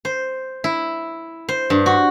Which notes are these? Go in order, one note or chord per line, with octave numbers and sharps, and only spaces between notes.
C5
E4
C5
G2
F#4